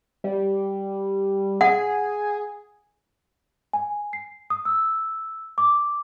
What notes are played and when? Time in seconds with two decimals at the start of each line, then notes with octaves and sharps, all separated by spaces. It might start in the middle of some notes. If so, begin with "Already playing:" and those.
0.24 G3
1.61 G#4 F#5
3.73 G#5
4.13 C7
4.50 D#6
4.65 E6
5.58 D6